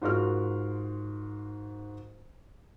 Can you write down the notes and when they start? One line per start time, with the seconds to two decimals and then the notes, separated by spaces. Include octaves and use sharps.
0.02 G#2 F4 F#4 A#4 F6